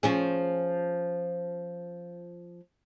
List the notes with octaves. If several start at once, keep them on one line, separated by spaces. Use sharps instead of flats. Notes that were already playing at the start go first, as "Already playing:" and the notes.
F3 C#4 G#4